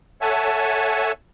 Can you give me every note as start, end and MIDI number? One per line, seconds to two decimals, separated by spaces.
0.21 1.12 69
0.21 1.12 73
0.21 1.12 76
0.21 1.12 78
0.21 1.12 80
0.21 1.12 81